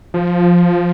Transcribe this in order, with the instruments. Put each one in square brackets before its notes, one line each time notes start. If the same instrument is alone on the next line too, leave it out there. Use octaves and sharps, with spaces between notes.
[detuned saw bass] F3